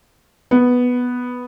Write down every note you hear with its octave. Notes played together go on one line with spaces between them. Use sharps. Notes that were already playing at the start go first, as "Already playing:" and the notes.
B3